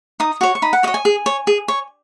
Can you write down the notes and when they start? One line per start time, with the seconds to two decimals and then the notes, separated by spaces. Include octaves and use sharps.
0.20 D#4 D#6
0.41 F#4 C#5
0.55 C#6
0.62 D#4 B5
0.73 F#5
0.83 F#4 C#5 D#5
0.94 G#5
1.05 G#4
1.26 C#5
1.47 G#4
1.68 C#5